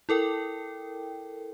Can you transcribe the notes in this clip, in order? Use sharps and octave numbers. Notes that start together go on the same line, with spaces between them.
E4 A4 A#4 G5